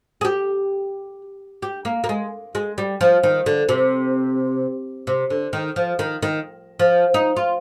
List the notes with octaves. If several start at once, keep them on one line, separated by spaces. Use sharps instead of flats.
G#4
G4
G4
A#3
A#3
G#3
G#3
G3
F3
D#3
D3
C3
C3
D3
D#3
F3
D#3
D#3
F3
D#4
F4